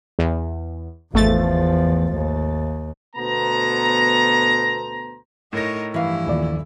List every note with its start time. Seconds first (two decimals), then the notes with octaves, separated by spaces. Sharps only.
0.19 E2
1.14 G#1 E2 F3 A3 A6
2.13 D#2
3.16 D2 B2 B3 A4 C5 A#5
5.53 A2 D#4 A#4 C#5 A#6
5.94 G2 E3 F3 E4 F5
6.26 D#1 A#2 D5